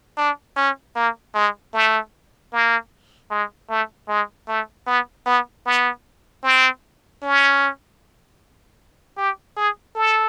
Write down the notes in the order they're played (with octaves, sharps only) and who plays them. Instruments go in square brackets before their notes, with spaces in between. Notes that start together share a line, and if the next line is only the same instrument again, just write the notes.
[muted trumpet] D4
C#4
A#3
G#3
A3
A#3
G#3
A3
G#3
A3
B3
B3
B3
C4
C#4
G4
G#4
A4